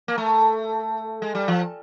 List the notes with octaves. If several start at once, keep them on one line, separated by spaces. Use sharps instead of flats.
A#3
A3
G#3
G3
F3